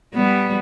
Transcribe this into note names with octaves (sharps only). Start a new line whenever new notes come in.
G3 B3